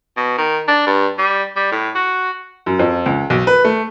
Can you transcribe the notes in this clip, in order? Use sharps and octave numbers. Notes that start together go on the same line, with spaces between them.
B2
D#3
D4
G2
G3
G3
A2
F#4
F#2
F2
C#2
B1
B4
A3